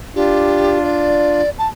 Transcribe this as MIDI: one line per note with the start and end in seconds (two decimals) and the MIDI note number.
0.16 1.41 62
0.16 1.41 65
0.16 0.79 67
0.84 1.50 74
1.59 1.68 81